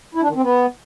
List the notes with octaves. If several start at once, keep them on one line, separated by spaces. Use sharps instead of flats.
E4
D4
D#3
C4
B3